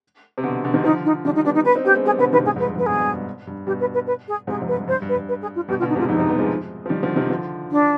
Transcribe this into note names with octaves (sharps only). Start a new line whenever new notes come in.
C3
B2 D3
B2 D3
C3 D#3
D3 F3 D#4
D#4
D#3 G3 D4
D#4
G3 B3 D4
D#4
B3 D4 B4
C4 D#4
B3 D4 G4
G#3 C4
G3 B3 G#4
B2 D3 B4
C3 D#3 B4
G#2 C3 G#4
F2 G#2
B4
G2
F2 G#2 B4
G2 B2 G#4
G2 B2
G2
G2
G2 B2 G4
B4
B4
B4
G#4
G#2 C3 G#4
F2 G#2
B4
G2
G2 C5
G2
B4
G2
B4
G#4
F4
G2 B2 G4
F4
B2 D3
D#4
G#2 C3
F4
F2 G#2 D#4
G#2 C3
G3 B3
F3 G#3
F3
D#3 G3
D3 F3
C3 D#3
D3 F3
D4